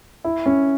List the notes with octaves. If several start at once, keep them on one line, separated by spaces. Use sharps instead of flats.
E4
C#4